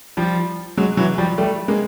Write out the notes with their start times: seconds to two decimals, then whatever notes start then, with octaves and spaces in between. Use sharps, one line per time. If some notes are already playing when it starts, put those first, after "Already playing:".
0.17 F3 G3
0.77 F#3 G#3
0.97 E3 F#3
1.18 F3 G3
1.38 G3 A3
1.68 G#3 A#3